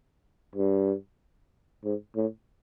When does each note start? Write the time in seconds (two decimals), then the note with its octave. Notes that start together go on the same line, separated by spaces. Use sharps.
0.55 G2
1.84 G#2
2.16 A2